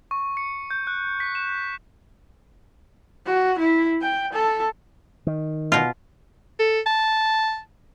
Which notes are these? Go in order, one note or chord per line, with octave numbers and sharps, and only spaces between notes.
C#6
C#7
G6
F#6
B6
E7
F#4
E4
G5
A4
D#3
B2 F4
A4
A5